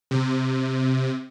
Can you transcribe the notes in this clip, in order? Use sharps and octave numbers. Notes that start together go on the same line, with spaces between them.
C3